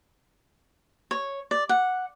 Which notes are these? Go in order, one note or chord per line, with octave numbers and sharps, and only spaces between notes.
C#5
D5
F#5